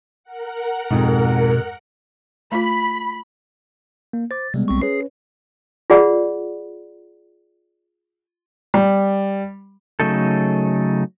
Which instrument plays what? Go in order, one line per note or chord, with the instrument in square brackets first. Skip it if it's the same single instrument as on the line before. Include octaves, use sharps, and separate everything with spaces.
[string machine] A#4 F#5
[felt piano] F2 G#2 [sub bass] B2
[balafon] A3 F4 [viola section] B5
[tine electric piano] A#3
[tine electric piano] C5 D6 [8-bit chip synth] A6
[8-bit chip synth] C3 [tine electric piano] G3 G#3 B3
[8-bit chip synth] B1 C4 C#6
[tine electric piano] C#4 B4 C#5 [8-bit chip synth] G#4 C7
[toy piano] F4 G#4 D5 F#5 B5
[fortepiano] G3
[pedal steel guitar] C#3 F#3 A3 D#4 A4